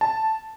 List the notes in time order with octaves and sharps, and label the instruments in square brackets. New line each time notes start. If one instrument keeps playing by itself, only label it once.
[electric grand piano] A5